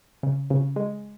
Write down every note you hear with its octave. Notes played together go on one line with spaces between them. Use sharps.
C#3
C#3
G#3